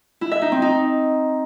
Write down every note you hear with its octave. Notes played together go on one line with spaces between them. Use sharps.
E4
E5
D#4
C4
D#4